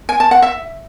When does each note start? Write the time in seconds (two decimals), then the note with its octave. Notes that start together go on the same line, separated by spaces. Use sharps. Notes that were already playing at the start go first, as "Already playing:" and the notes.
0.09 G#5
0.20 A5
0.31 F#5
0.42 E5